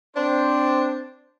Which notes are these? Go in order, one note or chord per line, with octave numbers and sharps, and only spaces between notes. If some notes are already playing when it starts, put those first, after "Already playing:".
C4 D4 C5